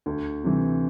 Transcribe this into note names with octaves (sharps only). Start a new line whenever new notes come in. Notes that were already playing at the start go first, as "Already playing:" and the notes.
D2
C3 E3